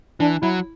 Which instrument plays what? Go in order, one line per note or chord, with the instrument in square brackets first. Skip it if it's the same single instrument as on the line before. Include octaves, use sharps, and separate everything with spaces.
[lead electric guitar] E3 [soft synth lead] D4
[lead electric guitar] F#3 [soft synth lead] E4